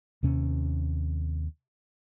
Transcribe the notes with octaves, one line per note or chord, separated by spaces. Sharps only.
D#2 C3 C#4